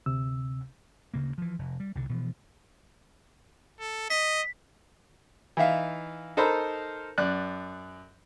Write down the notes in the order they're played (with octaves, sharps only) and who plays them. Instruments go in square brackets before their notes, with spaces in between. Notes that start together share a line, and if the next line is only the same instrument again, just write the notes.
[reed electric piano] D2 C3 E6
[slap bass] D2 C#3 A#3
E3 F3
F1
G3
C2 B2 D3
B2 E3 F3
[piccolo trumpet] A4
[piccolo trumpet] D#5 [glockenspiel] B6
[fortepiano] E3 D#4 E5 F5
D#4 A4 A#4 C5 A#5 B5
F#2 D5 F#6